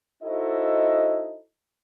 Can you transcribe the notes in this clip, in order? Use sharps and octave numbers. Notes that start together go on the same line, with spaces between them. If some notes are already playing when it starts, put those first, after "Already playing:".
D#4 E4 F#4 A4 C5 D#5